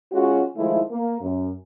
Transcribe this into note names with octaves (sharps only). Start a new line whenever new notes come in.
G#3 C#4 F4 F#4
D#3 F3 G#3 A3 E4
A#3
F#2